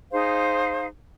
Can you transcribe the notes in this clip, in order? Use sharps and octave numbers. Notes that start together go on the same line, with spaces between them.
D#4 G#4 C5 F5